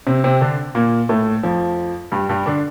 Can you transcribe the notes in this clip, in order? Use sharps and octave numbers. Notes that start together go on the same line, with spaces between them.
C3 C4
C3 C4
D3 D4
A#2 A#3
A2 A3
F2 F3
G2 G3
G2 G3
D3 D4